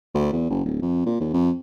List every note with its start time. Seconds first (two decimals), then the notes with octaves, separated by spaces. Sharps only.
0.14 D2
0.32 E2
0.50 F#1
0.65 D1
0.82 F2
1.06 A#2
1.20 D#2
1.33 F2